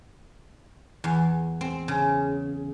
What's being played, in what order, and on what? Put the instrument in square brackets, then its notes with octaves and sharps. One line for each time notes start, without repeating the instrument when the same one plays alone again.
[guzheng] E2
C4
C#3